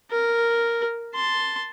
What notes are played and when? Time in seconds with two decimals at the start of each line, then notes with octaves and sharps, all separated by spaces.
0.11 A#4
1.15 A5 C6